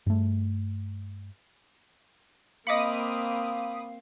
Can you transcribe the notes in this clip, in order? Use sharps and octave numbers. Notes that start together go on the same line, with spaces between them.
G2 A3
A#3 C4 D#5 F5 B5 D6 D#6 C#7